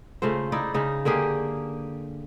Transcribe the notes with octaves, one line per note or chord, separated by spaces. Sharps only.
C#3 A3 F4 C5
D#4 E4 D5
C#3 D#4
D3 A#3 G4 G#4